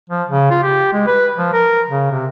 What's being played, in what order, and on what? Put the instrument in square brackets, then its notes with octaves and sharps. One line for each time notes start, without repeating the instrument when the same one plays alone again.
[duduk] F3
C#3
F4
G4
G#3
B4
F3
A#4
C#3
C3